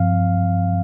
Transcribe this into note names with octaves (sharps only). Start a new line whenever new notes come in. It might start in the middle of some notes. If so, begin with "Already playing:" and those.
Already playing: G2 F3 C4 F5